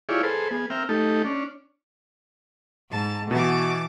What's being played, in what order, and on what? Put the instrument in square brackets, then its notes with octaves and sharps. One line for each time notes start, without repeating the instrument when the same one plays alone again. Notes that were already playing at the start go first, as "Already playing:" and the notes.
[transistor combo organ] E4 F4 G4 G#4 C#5 D5
G#4 A4 B4 C5
B3 G#4
C4 A#4 E5 G5 F6
A3 D#4 G4 A4
C#4 D4
[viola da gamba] G#2 [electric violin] A5
[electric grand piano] B2 [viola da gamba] E3 [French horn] F#4 [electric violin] A5 D6